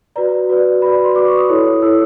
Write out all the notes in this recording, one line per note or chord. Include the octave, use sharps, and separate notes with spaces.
F#4 B4 D5 A#5
F#4 B4 D5
F#4 B4 D5 B5
B5
C6
F#4 B4 D5 D6
C#6
D#6
E4 A4 C#5
E4 A4 C#5 E6